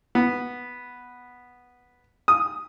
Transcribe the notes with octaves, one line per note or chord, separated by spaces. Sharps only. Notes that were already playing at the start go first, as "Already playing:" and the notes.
B3
D#6